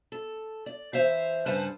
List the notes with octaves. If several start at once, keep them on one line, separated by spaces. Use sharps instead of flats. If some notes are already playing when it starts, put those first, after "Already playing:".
A4
D5
E3 C5 E5 F5
G2 C#3 B4 C5 F#5 A5